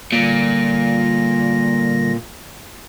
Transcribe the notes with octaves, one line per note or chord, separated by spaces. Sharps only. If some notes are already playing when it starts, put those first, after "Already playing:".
A#2 D3 G3 A#6